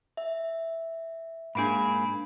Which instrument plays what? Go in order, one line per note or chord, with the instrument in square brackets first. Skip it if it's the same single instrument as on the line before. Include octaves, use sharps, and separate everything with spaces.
[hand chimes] E5
[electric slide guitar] G#2 A#3 G#4 [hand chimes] D4 B5